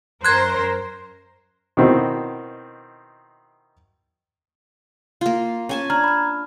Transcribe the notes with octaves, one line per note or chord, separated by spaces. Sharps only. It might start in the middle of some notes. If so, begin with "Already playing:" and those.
F#2 A#4 C5 F#6 G#6
B2 D#3 C4 E4 F#4
A#3 F4
C#4 G#5 A5
D4 A#5 F6 G#6
B5 F6